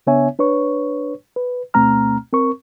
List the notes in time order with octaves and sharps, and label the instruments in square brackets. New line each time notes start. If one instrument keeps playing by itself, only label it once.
[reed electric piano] C#3 B3 D4 C#5 E5 G#5
D4 B4 C#5 C#6
B4
D2 B2 A3 C4 A#5 F6
C4 A#4 C#6